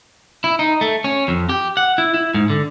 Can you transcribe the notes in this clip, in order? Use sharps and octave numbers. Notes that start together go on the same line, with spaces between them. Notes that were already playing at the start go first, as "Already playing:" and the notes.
E4
D#4
A3
C#4
F2
G4
F#5
E4
E4
G#2
D3